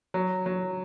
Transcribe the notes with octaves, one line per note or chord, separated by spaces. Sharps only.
F#3
F#3